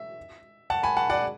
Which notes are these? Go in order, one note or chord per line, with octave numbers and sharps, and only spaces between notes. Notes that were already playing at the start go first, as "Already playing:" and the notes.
Already playing: E5
F#5 A5
G#5 B5
F#5 A5
D5 F#5